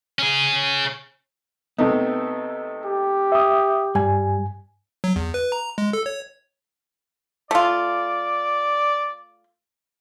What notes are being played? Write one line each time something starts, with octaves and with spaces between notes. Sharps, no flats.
C#4 G#4
C3 A3 B3 D#4
G4
E5 D#6
G2 G3 G#5
F#3
E2
B4
A#5
G#3
A4
C#5
A3 F4 D5